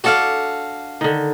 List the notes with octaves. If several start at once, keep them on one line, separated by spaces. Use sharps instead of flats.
D4 F#4 A4 D5 F5
D3 D#3